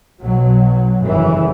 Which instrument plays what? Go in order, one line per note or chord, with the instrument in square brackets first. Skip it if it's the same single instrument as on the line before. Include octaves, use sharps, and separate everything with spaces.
[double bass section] B1 B2 F#3
G1 F#2 C#3 E3